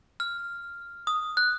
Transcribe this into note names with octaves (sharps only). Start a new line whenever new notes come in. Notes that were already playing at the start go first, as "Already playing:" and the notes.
F6
D#6
F#6